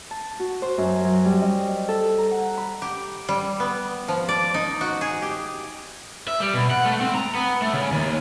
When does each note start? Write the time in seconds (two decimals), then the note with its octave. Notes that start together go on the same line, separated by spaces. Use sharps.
0.11 A5
0.40 F#4
0.62 C5
0.78 F#2
1.04 F#3
1.25 G3
1.41 D#5
1.88 A4
2.18 A#5
2.31 F#5
2.57 B5
2.82 G4
3.29 G3
3.60 B3
4.08 F3
4.29 D5
4.54 D#4
4.81 F#4
5.01 G#4
5.22 G4
6.28 E5
6.40 G3
6.54 B2
6.71 F#5
6.86 A3
7.01 C4
7.15 A#5
7.35 B3
7.62 A3
7.74 C#3
7.92 D#2